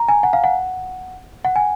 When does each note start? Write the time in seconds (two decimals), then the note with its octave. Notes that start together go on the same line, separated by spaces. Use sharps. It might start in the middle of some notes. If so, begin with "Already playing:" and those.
Already playing: A#5
0.08 G#5
0.23 F#5
0.33 F5
0.44 F#5
1.45 F#5
1.56 G#5